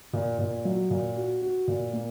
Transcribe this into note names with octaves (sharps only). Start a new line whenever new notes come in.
A#2
A#2
F#3
A#2
F#4
F#4
A#2
A#3